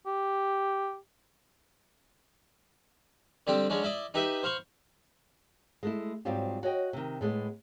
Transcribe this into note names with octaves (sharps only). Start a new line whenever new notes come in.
G4
D3 G3 C4 D4 G5
F#3 G#3 C#4 D4
E4 D5 D#5
D#4 G4 B4 E5
C5 F5 B5 C#6
G#3 A3 E4
G#2 F#3 G3 C4 F4 G4
F#4 C#5 D#5 G5
C3 D#3
A2 G#3 A3 B3